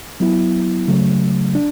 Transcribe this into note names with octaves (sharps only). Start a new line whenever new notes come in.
F#3 B3 E4
C#3 F#3 A3
D4